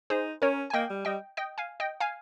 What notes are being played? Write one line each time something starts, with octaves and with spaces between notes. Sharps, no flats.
D#4 G#4 C5
C#4 A#4 C#5
G#5
A#3 D#5 G5
G3
G3 D#5 G5
D#5 G5
F5 G#5
D#5 G5
F5 G#5